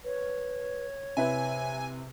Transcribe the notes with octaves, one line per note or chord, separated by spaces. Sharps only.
B4 C#5
C3 E4 B4 E5 G#5